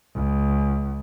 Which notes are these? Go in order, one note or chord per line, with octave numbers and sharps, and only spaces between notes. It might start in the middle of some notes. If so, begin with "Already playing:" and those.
C#2